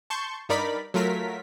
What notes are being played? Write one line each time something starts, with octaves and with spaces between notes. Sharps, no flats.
A5 C6 C#6 G6
G2 D#4 A#4 D5 B5 B6
F#3 A3 F4 A#4 B6